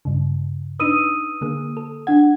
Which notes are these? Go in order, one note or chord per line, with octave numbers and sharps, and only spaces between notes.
G2 C#3
D4 D#4 B4 D#6 E6 D#7
D3 A#3 G#4
A4
D4 F#5 G#6